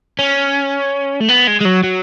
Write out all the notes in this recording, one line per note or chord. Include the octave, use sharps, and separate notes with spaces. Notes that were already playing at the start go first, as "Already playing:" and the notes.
C#4
A3
B3
G#3
G#3
F#3
F#3